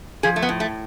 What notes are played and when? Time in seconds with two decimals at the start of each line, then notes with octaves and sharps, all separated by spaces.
0.23 F3 G#4
0.36 A3
0.42 B3
0.49 A2
0.60 A3